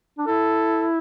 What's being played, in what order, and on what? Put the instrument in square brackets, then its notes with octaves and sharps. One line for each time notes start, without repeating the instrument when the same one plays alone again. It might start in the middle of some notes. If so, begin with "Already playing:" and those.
[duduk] D4
[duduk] E4 [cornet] A4